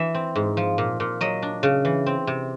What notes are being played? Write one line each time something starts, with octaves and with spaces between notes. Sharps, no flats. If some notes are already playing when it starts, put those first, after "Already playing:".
Already playing: E3 E5
C4
G#2
F3
A#2
A#2
F#3 D#5
D4
C#3
E3
C4
C3